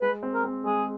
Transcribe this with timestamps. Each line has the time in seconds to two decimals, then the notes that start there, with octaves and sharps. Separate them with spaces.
0.01 G#3 B4
0.23 C4
0.34 A#4
0.44 C4
0.65 G#3 G#4